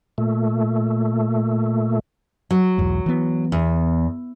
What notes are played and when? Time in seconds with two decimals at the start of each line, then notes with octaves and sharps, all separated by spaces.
0.18 A#2 A3
2.51 F#3
2.78 B1 E2 G#2
3.06 E3 B3
3.52 E2